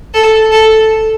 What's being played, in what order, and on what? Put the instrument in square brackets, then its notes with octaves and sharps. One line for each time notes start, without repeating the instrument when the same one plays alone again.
[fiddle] A4
A4